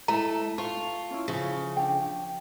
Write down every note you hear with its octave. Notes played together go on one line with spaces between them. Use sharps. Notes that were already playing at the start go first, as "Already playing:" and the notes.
G#3 A3 E4 A#5
F4 A5 C#6
C#4 E4
C#3 F3 C#6
D4 G5